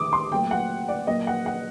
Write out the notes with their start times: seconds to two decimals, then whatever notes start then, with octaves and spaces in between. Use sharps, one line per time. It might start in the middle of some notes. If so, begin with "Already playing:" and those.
Already playing: D2 C3 D#3 A3 D6 D#6
0.13 C6
0.32 A#2 F#3 A3 G5
0.51 F#5
0.88 D5
1.07 A#2 F#3 A#3 D#5
1.27 F#5
1.46 F#5